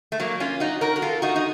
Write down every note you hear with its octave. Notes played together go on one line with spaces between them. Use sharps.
A3
F#3 A#3
C#4 F4
D#4 F#4
F#4 A#4
A#4
F4 A4
D#4 F#4
D#4